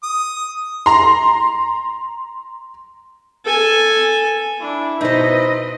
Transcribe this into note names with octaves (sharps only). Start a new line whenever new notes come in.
D#6
A#5 C6
A4 G#5
D4 E4
B2 D#4 B4 C5 D#5